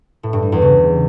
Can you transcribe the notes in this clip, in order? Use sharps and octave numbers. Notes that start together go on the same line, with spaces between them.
A2
G2
G3
E2
C#3